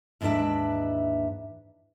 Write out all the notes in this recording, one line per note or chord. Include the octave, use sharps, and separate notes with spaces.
D#2 G#2 E3 D4 B4 E5